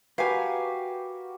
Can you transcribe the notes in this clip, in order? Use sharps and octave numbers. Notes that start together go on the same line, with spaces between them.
F#4 G4 A#4 B4 F5 G#5